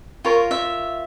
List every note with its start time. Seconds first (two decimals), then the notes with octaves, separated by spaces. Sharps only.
0.25 F4 A#4 C#5
0.51 E5